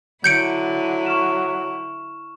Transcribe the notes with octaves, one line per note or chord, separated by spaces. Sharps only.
D3 F#3 E4 G6 C#7 D7
C#6 F6 E7